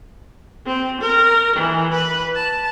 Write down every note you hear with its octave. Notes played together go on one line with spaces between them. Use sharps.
C4
A#4
E3
B4
A5